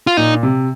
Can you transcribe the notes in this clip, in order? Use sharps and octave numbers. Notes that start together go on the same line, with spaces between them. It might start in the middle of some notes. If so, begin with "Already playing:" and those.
F4
A#2 D#4
C3